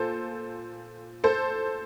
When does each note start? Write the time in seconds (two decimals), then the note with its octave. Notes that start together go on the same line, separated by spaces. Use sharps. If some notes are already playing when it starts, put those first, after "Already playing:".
Already playing: A#2 A4 C5
1.24 A4 C5